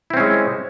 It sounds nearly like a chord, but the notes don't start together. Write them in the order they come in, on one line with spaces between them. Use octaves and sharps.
E4 C4 C#4 G#3